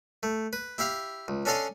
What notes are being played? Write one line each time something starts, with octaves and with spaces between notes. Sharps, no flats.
A3
B4
E4 G4 E5 F5
C#2
C#4 D4 A4 D#5 F5 C6